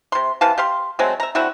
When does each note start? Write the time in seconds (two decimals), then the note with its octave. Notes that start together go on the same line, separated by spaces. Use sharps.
0.12 C3 C6
0.41 C3 E3 F5 A5
0.58 G4 F5 C6
0.99 F#3 G#3 A3 C4
1.20 E5 A#5
1.35 D3 C4 E4 F#4